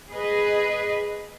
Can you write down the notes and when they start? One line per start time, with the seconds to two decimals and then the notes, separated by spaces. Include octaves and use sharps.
0.11 G#4 B4 D#5